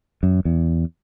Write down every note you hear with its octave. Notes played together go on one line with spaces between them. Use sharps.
F#2
E2